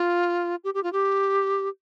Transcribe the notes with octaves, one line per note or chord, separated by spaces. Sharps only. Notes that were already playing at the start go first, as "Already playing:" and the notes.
Already playing: F4
G4
G4
F4
G4